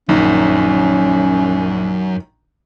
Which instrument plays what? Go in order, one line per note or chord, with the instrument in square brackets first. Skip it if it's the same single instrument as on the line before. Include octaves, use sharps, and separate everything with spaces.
[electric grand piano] A#1 [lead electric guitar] F#2 [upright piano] D#3 [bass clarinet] C#4